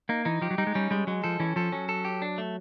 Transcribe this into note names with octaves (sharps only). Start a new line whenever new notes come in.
A#3 D#4
E3 D#4
F3 G4
F#3
G3 D#4
G#3
G3 C#4
G3 G#3
F#3 G#3
F3 A4
E3 C#4
F3 A4
F#3 C#4
A4
G4
D4
A3